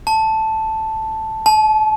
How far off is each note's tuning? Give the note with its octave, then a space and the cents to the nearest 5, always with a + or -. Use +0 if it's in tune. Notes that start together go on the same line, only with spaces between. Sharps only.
A5 +0
A5 -35